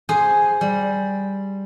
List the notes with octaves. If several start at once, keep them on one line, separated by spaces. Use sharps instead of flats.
G#4 C5 G#5
G3